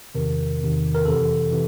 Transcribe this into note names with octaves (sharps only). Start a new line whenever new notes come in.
E2 C3 D#3 A#4
E2 C3 D#3
A#4
F2 C3 E3 A4
C3 E3